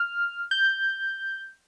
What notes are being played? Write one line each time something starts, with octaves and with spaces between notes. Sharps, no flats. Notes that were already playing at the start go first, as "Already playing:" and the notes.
Already playing: F6
G6